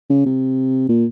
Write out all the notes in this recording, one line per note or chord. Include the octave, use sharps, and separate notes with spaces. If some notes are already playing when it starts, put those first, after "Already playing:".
C#3
C3
A#2